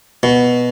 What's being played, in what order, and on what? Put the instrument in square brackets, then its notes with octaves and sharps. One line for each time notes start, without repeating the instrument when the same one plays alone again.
[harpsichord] B2